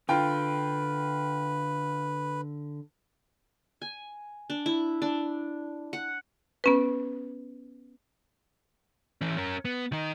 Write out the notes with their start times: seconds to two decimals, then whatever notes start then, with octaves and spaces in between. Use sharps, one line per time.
0.09 D3 F4 B4 G5
3.82 G#5
4.50 D4
4.66 E4
5.02 D4
5.93 F#5
6.64 B3 C#4 B4
9.21 E3 C#4
9.37 C#4 A#4
9.65 B3
9.92 D#3 D#4